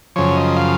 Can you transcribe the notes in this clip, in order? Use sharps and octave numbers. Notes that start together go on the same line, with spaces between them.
F#2 C#3 F3 C#5
D#5
F5